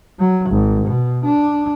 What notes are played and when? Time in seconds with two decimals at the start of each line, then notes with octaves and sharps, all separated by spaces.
0.19 F#3
0.50 G#1
0.86 B2
1.25 D4